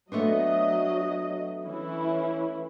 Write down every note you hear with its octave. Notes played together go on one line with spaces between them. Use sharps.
F#3 A3 B3 D4 D#5
E3 C#4 E4